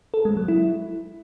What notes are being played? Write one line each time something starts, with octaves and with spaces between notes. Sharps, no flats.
A4
G#3
F#3
E4